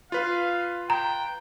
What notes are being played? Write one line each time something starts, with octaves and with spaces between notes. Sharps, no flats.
F4 B4 F5
G5 A#5